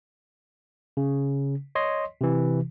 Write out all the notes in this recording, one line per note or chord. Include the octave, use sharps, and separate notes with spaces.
C#3
C#5 D#5 C6
C3 E3